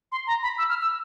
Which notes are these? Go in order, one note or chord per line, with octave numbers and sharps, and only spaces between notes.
C6
A#5
B5
E6
F6
E6